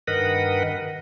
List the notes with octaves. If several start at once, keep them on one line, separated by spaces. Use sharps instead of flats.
G2 D#3 A#4 B4 D#5 F#5